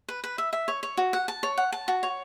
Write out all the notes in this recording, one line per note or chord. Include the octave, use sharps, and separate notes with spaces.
B4
B4
E5
E5
C#5
C#5
F#4
F#5
A5
C#5
F#5
A5
F#4
C#5